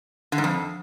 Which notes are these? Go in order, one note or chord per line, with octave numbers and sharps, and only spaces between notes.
D3
G#2
F2